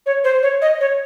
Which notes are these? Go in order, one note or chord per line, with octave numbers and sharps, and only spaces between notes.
C#5
C5
C#5
D#5
C#5